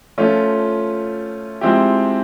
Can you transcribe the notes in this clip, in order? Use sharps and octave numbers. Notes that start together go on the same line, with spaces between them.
F3 A3 C#4 F4
F3 G#3 C4 E4 G4